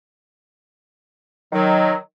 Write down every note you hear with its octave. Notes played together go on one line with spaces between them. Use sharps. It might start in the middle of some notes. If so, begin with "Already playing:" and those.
D#3 F#3